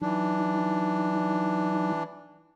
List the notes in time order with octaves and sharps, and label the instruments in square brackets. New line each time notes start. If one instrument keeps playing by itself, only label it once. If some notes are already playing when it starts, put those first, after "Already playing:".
[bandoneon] E3 D4 [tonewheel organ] F#3 D#4